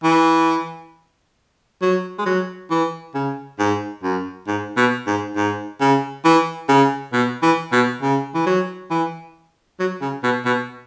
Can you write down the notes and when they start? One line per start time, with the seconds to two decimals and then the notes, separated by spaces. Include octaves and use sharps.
0.04 E3
1.82 F#3
2.19 G#3
2.26 F#3
2.70 E3
3.15 C#3
3.59 G#2
4.03 F#2
4.47 G#2
4.77 B2
5.07 G#2
5.36 G#2
5.81 C#3
6.25 E3
6.69 C#3
7.13 B2
7.43 E3
7.72 B2
8.02 C#3
8.35 E3
8.46 F#3
8.90 E3
9.80 F#3
10.01 C#3
10.23 B2
10.46 B2